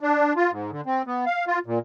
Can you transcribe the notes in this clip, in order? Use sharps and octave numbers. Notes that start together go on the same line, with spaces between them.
D4
F4
G#2
D3
C4
B3
F5
F4
A#2